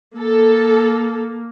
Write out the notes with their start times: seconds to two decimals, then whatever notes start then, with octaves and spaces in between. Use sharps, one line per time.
0.18 A#3 A4